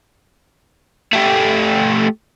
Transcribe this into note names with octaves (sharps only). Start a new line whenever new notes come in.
A3 G4